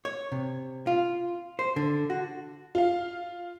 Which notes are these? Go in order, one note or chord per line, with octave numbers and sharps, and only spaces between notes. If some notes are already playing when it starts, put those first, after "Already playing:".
C#5
C3
F4
C5
D3
F#4
F4 F5